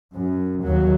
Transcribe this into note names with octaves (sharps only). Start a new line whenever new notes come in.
F#2
D#2 F#3